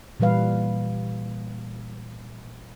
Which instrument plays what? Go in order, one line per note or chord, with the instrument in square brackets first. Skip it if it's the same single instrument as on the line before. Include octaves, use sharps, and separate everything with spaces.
[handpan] A#2 E3 G3 B4 F5